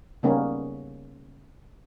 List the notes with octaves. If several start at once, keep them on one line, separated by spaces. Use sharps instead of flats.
C#3 G3 A#3 B3 C#4 D#4